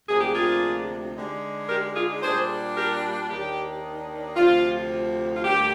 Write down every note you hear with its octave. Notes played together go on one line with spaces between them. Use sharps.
D2 C3 F3 A#3 D4 G#4
G4
F4 G#4
D3 G#3 D#4
G4 A#4
F4 G#4
A#2 G3 D4 G#4 C5
G4 A#4
D#2 D#3 A#3 D4 G4
D2 C3 F3 F4
F4
D2 D3 G3 A#3 G4